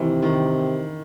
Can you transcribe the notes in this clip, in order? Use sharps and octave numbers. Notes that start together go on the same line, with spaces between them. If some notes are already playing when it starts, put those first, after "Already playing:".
Already playing: C3 D#3 E3
D#3